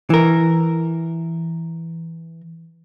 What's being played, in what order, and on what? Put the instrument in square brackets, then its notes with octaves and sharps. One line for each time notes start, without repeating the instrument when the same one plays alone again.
[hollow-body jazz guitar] E3 A#4